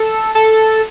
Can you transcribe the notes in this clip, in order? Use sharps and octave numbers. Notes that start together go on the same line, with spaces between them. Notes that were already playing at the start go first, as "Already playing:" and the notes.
Already playing: A4
A4